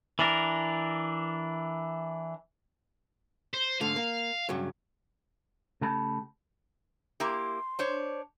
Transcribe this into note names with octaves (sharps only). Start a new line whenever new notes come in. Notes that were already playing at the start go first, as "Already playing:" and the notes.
E3 D4 A#4
C5
G#2 D3 A3 F5
A#3
G2 C#3 F#3
C#3 A3 G4 A5 B5
A#3 E4 G4 C6
D4 C5 C#5